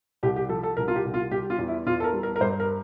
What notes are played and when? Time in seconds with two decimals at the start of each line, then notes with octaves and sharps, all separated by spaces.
0.23 C2 G4
0.36 G4
0.49 F3 A4
0.63 A4
0.77 C2 A#4
0.88 F4
0.95 G4
1.05 C2
1.14 F4
1.31 G3 G4
1.50 F4
1.59 E2
1.68 E4
1.87 E2 F4
2.00 A4
2.04 A#4
2.14 G3
2.23 A#4
2.36 A#4
2.41 G2 C5
2.60 A#4